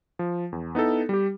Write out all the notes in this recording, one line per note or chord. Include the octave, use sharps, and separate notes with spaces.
F3
E2
B3 D#4 E4 A4
G3 G4